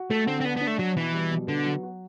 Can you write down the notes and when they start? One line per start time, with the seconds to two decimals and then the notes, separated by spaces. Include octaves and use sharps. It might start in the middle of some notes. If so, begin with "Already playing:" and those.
Already playing: F#4
0.10 A3 A4
0.27 D3 C4
0.40 C4
0.44 B3 D4
0.56 B3 D4
0.67 A3
0.79 F#3 F#4
0.96 B2 E3
1.13 G3
1.31 B2
1.48 D3 B3
1.65 F#3
1.83 F#4